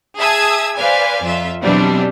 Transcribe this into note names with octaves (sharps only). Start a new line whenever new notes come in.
G#4 E5 A5 D#6 E6 G#6
B4 C5 D5 F5 G#5
F2 F4 E5
B2 E3 F#3 G3 C4 D4